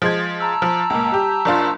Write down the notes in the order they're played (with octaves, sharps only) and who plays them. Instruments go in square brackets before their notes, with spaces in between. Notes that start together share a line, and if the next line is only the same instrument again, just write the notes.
[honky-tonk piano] F3 G#3 G#6
[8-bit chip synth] A5 A#5 E6
[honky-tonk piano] F3
C#2 A#2
G3 G4
F#1 D4 F4